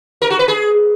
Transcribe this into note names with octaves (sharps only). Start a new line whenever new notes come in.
A#4
F#4
B4
G#4